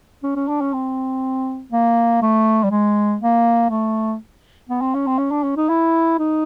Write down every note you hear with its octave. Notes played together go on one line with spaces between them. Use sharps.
C#4
C#4
D4
C#4
C4
A#3
A3
G3
G#3
A#3
A3
B3
C4
C#4
C4
C#4
D4
C#4
D#4
E4
D#4